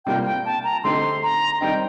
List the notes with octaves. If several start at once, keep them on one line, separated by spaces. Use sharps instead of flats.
C3 G3 A#3 F4 G5
G5
A5
A#5
D3 A3 C4 D#4 G4 C6
A#5
D#3 G3 C4 D#4 G5